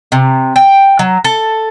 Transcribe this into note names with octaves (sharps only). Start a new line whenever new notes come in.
C3
G5
F#3
A4